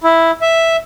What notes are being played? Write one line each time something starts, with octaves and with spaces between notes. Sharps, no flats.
E4
E5